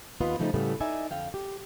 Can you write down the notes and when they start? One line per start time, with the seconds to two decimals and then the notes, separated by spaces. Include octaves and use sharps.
0.20 D#2 B3 F4 B4 D#5 F#5
0.39 C#3 F3 G3 A3 D4 D#4
0.54 A2 C#3 G3 A3 B3
0.80 D#4 D5 E5 G#5
1.11 F2 D3 F5 G5
1.34 G4